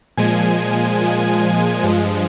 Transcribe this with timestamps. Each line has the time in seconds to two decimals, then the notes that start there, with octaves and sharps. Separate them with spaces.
0.17 A#2 F3 G#3 G#5
1.01 A#2 F3 G#3
1.83 G2 F3 G#3